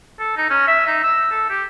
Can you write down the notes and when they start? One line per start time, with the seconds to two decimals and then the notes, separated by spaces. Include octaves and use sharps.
0.19 A4
0.37 D#4
0.50 C#4
0.67 E5
0.87 D#4
1.03 E6
1.31 A4
1.50 G4